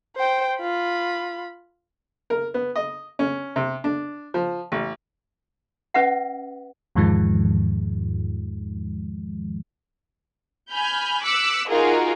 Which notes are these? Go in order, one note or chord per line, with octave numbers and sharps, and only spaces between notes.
C5 G5
F4 B5
A#4
B3
D#5
C#4
C3
D4
F3
A1
C#4 B4 E5 F#5
E2 G#2 D#3 F3 G#3
G#5 B5 F6 G6
D6 E6 F#6 B6 C#7
D#4 F4 F#4 G#4 A#4